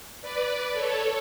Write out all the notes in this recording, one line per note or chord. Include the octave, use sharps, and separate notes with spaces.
B4 D5
A4 C#5